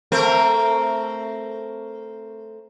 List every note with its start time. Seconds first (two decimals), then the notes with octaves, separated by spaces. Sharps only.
0.12 A3 C4 A#4